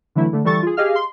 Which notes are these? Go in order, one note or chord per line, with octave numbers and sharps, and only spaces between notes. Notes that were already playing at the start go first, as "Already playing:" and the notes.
D3 E3 F#3 A3 E4
D3 A3
E3 G3 A4 C#6 A6
F4 G#4
G4 G#4 D#5 F5 F6
C6